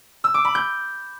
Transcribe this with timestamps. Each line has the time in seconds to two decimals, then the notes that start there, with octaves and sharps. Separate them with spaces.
0.24 E6
0.34 D6
0.45 B5
0.55 G6